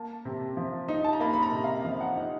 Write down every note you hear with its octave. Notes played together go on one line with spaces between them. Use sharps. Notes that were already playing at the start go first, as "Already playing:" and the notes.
Already playing: A#3 A5
C3
F3
D#4
A5
A#5
A#3 B5
B5
A#5
C3
F5
F3 F5
F#5
D#4